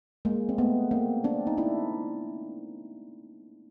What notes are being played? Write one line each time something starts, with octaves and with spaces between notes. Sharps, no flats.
G#3 A#3
C4
A3 B3
A#3 C4
C4 D4
D#4
D4 E4